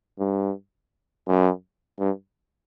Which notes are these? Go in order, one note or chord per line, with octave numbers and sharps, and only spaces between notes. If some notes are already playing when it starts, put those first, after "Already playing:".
G2
F#2
G2